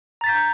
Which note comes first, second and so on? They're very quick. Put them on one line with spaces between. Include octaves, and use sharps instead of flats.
A#5 A6 B6 G6